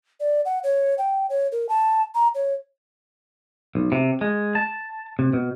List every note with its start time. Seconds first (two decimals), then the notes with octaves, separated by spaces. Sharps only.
0.20 D5
0.45 F#5
0.64 C#5
0.98 G5
1.30 C#5
1.52 A#4
1.69 A5
2.15 A#5
2.35 C#5
3.75 B1
3.92 C3
4.21 G#3
4.55 A5
5.19 C3
5.33 B2